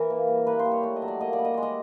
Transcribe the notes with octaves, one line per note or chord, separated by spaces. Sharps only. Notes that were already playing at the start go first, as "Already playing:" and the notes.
Already playing: E3 A#4
A#3
G3
A#3 B4
C5
G3
C#5
A3 D5
D#5
F#3
D5
A#3 D#5
D5
G3
D#5
G#3 D5
D#5